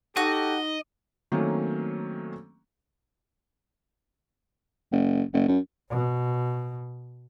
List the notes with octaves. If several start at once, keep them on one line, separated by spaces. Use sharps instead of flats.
D#4 F#4 G4 A4 D#5
D#3 F#3 A3 A#3 C4 C#4
F#1
F#1
F#2
B2